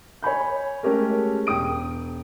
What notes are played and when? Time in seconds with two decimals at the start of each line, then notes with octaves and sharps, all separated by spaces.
0.23 C#5 G#5 B5 G6
0.83 G#3 A3 C#4 G4 A4 A#4
1.47 E1 G5 D#6 D7